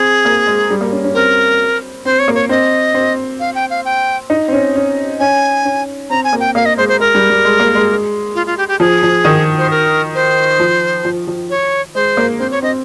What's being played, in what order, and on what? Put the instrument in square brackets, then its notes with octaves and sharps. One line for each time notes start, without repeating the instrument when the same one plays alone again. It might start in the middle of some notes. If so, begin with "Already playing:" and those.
Already playing: [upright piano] C4 [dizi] G#4
[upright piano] A#3
G#3
G3
A#3
C#4
C#4
[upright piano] C4 [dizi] A#4
[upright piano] C4 [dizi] C5
[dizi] C#5
[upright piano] A#3
[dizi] C#5
[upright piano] C4 [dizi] D#5
[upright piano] C4
[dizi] F5
G5
F5
G5
[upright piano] D#4
C4
C#4
C#4
[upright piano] C#4 [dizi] G#5
[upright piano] C#4
[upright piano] C4 [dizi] A#5
[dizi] G#5
[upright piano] A#3
[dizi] G5
[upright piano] A#3 [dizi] F5
[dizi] D#5
[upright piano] G#3 [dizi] C5
[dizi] C5
[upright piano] G#3 [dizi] A#4
[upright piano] G3
G3
G#3
A#3
G#3
[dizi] F4
F4
G4
G4
[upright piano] F3 [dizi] G#4
[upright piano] F3
D#3
[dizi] C5
A#4
C5
[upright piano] F3
F3
F3
[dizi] C#5
[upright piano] G#3 [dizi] C5
[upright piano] A#3
[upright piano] C4 [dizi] C5
[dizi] C#5
[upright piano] C4 [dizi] D#5